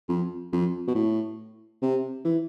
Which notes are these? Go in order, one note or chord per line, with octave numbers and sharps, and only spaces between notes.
F2
F2
B2
A2
C3
E3